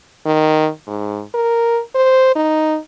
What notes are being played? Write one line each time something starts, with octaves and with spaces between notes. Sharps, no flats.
D#3
G#2
A#4
C5
D#4